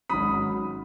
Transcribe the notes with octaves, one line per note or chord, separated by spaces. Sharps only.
G#1 G#2 F#3 C#4 B5 D#6